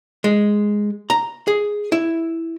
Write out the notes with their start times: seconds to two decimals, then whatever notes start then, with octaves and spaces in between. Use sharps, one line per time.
0.24 G#3
1.10 A#5
1.48 G#4
1.92 E4